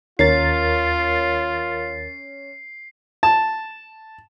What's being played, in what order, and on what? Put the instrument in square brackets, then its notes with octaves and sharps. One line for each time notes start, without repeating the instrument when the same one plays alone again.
[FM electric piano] D#2 A#4 A6 [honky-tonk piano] C#4 [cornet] F4 [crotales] C7
[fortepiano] A5